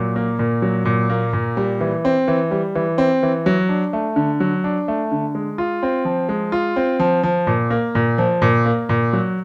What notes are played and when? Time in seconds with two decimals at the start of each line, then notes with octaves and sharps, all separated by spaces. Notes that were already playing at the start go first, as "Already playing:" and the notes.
Already playing: A#2 F#3
0.16 A#3
0.39 A#2
0.62 F#3
0.85 A#2
1.10 A#3
1.33 A#2
1.57 G3
1.81 E3
2.05 C4
2.28 E3
2.51 G3
2.75 E3
2.98 C4
3.23 E3
3.46 F#3
3.69 D4
3.93 A3
4.16 D3
4.40 F#3
4.64 D4
4.88 A3
5.11 D3
5.35 G#3
5.58 F4
5.83 C4
6.05 F3
6.29 G#3
6.52 F4
6.76 C4
6.99 F3
7.23 F3
7.47 A#2
7.70 A#3
7.95 A#2
8.18 F3
8.42 A#2
8.66 A#3
8.89 A#2
9.13 F#3